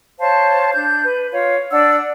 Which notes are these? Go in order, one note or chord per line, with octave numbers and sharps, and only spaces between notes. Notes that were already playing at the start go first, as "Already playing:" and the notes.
C5 C#5 F5 A5
D4 G6
B4
F4 C#5 F5
D4 D5 F#5 E6